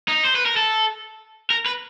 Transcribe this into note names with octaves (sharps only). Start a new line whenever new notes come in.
D#4
C5
B4
A#4
A4
A#4
B4